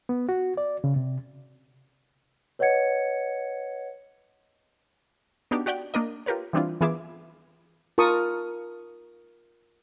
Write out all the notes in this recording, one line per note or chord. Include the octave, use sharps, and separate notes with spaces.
B3
F#4
D5
C#3
C3
B4 C#5 D#5 F#5 G#6 C#7
B3 D4 D#4 F#4 G4
F#4 G4 D5 F#5 G5
A#3 D4 A#4 D#5
F4 G4 A#4 B4 C#5
E3 G3 C4 D4 E4 F4
E3 B3 F4 G#4 E5 D6
F4 A#4 A5 C#6 D#6